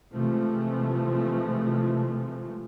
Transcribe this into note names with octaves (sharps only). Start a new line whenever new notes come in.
C3 E3 F3 G#3 A3